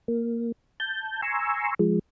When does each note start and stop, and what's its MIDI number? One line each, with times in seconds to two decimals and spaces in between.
0.08 0.52 58
0.80 1.21 81
0.80 1.21 91
1.22 1.74 80
1.22 1.74 82
1.22 1.74 84
1.22 1.74 85
1.22 1.74 88
1.79 1.99 53
1.79 1.99 56